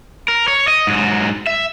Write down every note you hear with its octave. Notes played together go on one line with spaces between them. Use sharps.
A#4
C#5
D#5
G#2 F#3
E5